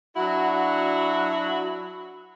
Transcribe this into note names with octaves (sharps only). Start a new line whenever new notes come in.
F#3 D4 E4 F#4